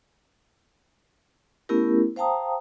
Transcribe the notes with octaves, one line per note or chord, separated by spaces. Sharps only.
A3 B3 C#4 E4 G4 A#4
C5 F5 G5 A5 A#5 D#6